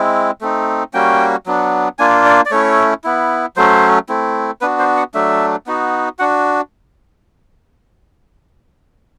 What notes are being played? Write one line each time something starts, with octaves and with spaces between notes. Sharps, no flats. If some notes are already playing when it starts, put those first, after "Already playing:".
Already playing: G#3 C4 E4
A3 C4 D#4
G3 A#3 C#4 F#4 G5
F#3 B3 D4
A#3 D4 F4 G#5
D5
D5
A3 C#4 E4 C#5
B3 E4
F#3 A3 C#4 C5
A3 C4 E4
B3 D4 F#4 B4
C5
F#5
F#3 A3 D4 E5
B3 D#4 F#4
D4 F#4 F#5